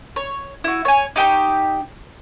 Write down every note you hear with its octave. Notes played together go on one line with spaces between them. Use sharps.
C#5
E4 F#4
C#5 G#5
D#4 G4 G5 C#6